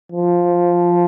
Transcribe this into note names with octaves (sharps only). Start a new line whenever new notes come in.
F3